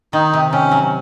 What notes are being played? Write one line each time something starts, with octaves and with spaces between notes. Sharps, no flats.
D#3 D#4
C3
C3 C#4
F#3